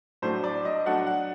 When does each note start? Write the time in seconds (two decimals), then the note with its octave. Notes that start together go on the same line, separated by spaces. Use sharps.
0.22 A2 F#3 A3 D4 C5
0.44 D5
0.65 D#5
0.86 F#3 A3 D4 F#5
1.07 F#5